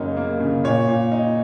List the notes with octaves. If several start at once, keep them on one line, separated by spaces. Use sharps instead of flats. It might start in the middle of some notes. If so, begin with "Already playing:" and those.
Already playing: F#2 C#3 A#3 D#4 A#4 C#5
A#3
C#3
A#2 C#5
A#2
D#4